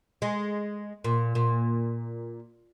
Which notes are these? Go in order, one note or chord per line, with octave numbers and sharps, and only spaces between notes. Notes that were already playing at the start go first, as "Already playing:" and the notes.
G#3
A#2
A#2